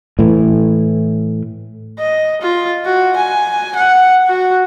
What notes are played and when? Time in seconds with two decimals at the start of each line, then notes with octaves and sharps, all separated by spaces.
0.19 A2 E3
1.99 D#5
2.42 F4
2.85 F#4
3.16 G#5
3.76 F#5
4.27 F#4